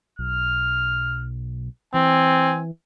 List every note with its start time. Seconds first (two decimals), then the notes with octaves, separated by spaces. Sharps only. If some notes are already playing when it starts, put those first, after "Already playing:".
0.19 B1 F6
1.94 E3 C4 G#5